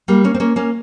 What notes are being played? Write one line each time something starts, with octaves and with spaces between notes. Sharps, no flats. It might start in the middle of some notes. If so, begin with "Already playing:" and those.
G3 A#3
A#3 C#4
C4
A#3 C#4
A#3 C#4